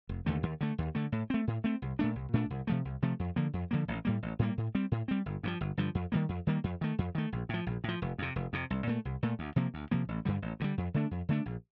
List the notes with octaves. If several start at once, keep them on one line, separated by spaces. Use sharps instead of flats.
F1
D#2 D3 A3
D#2
D3 A3
D#2
D3 A3
A2
A3 C4
A2
A3 C4
C2
A#2 A3 D4
C2
A#2 A3 D4
C2
C3 F3 A3
C2
C3 F3 A3
F2
D3 F3 A#3
F2
D3 F3 A#3
A1
A2 G3 A#3
A1
A2 G3 A#3
A2
G3 C4
A2
G3 C4
G1
G2 D3 F3
G1
G2 D3 F3
F2
D#3 G3 A#3
F2
D#3 G3 A#3
F2
D#3 A3
F2
D#3 A3
A#1
A2 F3
A#1
A2 F3
F1
F2 C3
F1
F2 C3
C2
A#2 A3
C2
A#2 A3
D2
C3 F3 A#3
D2
C3 F3 A#3
A1
G2 D3 G3
A1
G2 D3 G3
F2
D3 A3 D4
F2
D3 A3 D4
A#1